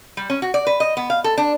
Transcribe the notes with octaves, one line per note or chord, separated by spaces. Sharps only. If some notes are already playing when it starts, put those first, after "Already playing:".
G3
C#4
F#4
D5
B4
D#5
B3
F5
A4
D4